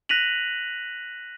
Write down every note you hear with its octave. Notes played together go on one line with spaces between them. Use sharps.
F#6 A#6 B6 D#7 F7 F#7